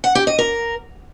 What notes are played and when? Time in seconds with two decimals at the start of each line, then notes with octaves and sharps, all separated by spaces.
0.04 F#5
0.15 G4
0.27 D#5
0.38 A#4